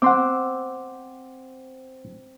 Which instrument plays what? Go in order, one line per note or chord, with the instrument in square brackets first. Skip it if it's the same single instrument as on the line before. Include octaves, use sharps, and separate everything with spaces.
[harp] C4 E6 [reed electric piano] F#5 C6 D6